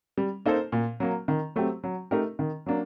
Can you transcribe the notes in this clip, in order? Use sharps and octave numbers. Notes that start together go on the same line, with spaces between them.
G3
A#3 D#4 A4 C5
A#2
F#3 A#3
D#3
F#3 A3 C4 G4
F#3
A3 D#4 G4 A#4
D#3
F#3 A#3 D4